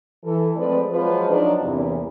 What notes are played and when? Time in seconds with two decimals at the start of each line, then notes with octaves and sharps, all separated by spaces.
0.24 E3 A4
0.56 F3 G#3 A3 C4 B4 D5
0.90 F3 F#3 G#3 F4 B4
1.29 F3 F#3 D4 D#4
1.61 E2 G2 C3 E3 A#3 C4